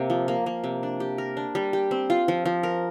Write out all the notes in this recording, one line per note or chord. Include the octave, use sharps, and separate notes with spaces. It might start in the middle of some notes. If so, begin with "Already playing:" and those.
Already playing: C3 A#3
F3
A#3
A#3
C3
D4
G4
A#4
D4
G3
G4
C4
F4
F3
F3
A#4